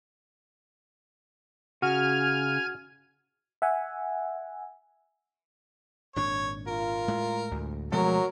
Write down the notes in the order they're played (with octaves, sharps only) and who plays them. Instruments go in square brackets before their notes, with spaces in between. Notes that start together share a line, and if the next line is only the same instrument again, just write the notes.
[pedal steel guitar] C#3 [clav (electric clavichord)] F#4 [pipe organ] G#5 G#6 [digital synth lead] F6
[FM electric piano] E5 F#5 G#5
[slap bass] G#1 A#2 D4 [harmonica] C#5
[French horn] F4 [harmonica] A#4
[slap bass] A2 G#3 A3
[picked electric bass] D2
[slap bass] D2 B2 A3 [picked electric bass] F3 G#3 [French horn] F#3 [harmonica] A#4